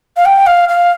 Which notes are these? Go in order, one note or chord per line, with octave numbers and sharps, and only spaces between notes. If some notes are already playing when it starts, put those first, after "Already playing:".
F5
G5
F5
F5